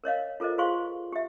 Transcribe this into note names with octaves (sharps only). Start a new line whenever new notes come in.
A#4 C#5 D#5 F5
F4 A4 A#4 C5 D#5
F4 G#4 C5 F5 C6 C#6
G4 E5